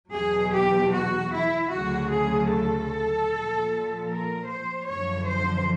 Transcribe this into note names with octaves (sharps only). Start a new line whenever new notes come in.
E2 B2 F#3 G#4
G4
F#4
E4
D2 C#3 F#3 F#4
G#4
A4
A#2 F3
A#4
C5
F#2 D3 F3 C#5
C5